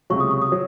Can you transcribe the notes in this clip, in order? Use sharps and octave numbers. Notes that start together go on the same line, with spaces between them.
C#2 C3 F#3 C#6
D#6
C#6
D#6
F#3